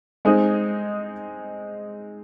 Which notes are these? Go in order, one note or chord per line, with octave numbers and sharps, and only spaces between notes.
G#3 C4 D#4 G#4